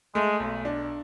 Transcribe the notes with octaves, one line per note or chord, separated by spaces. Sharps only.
G#3 A3
B1
D4